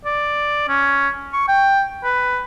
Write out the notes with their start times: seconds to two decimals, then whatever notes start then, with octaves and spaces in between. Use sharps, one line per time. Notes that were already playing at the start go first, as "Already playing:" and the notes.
0.05 D5
0.69 C#4
1.33 C#6
1.48 G5
2.04 B4